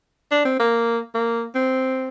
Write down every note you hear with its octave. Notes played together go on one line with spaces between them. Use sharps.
D4
C4
A#3
A#3
C4